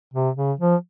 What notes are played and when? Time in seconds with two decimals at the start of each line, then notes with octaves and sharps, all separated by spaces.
0.14 C3
0.36 C#3
0.59 F3